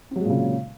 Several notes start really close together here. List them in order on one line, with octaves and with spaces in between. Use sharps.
C4 F#3 G#3 A#2 C#3